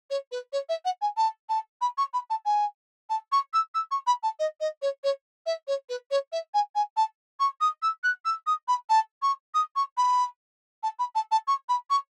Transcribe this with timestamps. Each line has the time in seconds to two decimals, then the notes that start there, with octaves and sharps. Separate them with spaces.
0.10 C#5
0.31 B4
0.52 C#5
0.69 E5
0.85 F#5
1.01 G#5
1.17 A5
1.49 A5
1.81 B5
1.97 C#6
2.13 B5
2.30 A5
2.45 G#5
3.09 A5
3.32 C#6
3.53 E6
3.74 E6
3.91 C#6
4.06 B5
4.23 A5
4.39 D#5
4.60 D#5
4.82 C#5
5.03 C#5
5.46 E5
5.67 C#5
5.89 B4
6.11 C#5
6.32 E5
6.54 G#5
6.75 G#5
6.96 A5
7.39 C#6
7.60 D#6
7.82 E6
8.03 F#6
8.25 E6
8.46 D#6
8.68 B5
8.89 A5
9.22 C#6
9.54 D#6
9.75 C#6
9.97 B5
10.83 A5
10.99 B5
11.15 A5
11.31 A5
11.47 C#6
11.68 B5
11.90 C#6